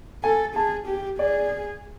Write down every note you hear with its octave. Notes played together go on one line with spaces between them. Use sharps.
A4 G#5
G#4 A5
G4
G#4 D5